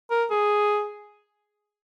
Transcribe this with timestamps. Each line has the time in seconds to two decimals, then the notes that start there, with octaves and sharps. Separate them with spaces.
0.10 A#4
0.30 G#4